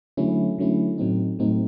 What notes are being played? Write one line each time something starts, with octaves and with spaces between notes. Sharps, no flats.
D3 F#3 A3 C#4 E4
D3 F#3 A3 C#4 E4
A2 F#3 A3 C4 D#4
A2 F#3 A3 C4 D#4